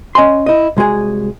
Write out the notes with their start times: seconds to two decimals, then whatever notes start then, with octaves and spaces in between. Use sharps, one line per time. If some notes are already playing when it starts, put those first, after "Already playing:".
0.15 C#4 D#5 G#5 C6
0.46 E4 D#5
0.77 C2 G#3 F#4 G#4 G#5